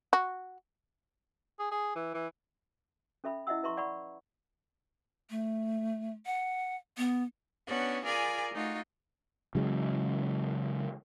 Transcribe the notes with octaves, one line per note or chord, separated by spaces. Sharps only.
F#4
G#4
G#4
E3
E3
C#4 A4 E5 B5
E4 D#5 E5 F#5 E6
B4 E5 A#5 C6 C#6
D5 F#5 B5 C#6
A3
F#5
B3
B3 C#4 D4 F#4
F4 G#4 A#4 D5 G#5
A3 D#4 F4 F#4
C#3 E3 F#3 G#3